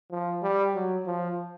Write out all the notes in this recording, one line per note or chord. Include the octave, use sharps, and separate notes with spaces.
F3
G3
F#3
F3